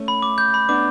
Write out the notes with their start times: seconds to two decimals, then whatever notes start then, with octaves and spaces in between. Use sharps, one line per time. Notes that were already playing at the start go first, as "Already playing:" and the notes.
Already playing: A3 C#4
0.08 B5
0.22 D6
0.38 G6
0.54 B5
0.69 B3 D4 D6